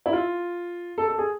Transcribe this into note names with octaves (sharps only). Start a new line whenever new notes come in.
E4
F4
A4
A4
G#4